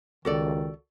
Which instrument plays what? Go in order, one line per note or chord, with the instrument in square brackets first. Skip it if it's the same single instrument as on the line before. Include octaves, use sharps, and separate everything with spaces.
[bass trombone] C#2 [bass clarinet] D#3 [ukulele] F#4 A4 D5